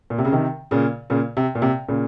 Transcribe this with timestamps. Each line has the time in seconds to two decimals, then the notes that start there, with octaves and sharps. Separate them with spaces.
0.10 A#2
0.18 C3
0.25 C#3
0.32 C3 D#3
0.71 A#2 C#3
1.10 A#2 C#3
1.37 C3
1.55 A#2
1.62 C3
1.89 A#2 C#3